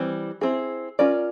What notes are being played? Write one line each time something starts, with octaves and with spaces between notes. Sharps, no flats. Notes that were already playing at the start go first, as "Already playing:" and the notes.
Already playing: E3 G3 C4
C4 E4 G#4
C#4 F4 A#4 D5